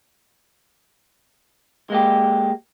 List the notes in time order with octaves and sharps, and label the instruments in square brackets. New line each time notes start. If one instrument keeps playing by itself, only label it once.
[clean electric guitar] G#3 A#3 G4